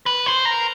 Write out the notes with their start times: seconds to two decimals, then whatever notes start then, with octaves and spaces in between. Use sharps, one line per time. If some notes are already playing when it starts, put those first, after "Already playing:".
0.06 B4
0.26 C5
0.45 A#4